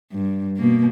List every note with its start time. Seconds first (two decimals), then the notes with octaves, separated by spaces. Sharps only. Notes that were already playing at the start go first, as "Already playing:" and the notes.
0.13 G2
0.57 B2 A#3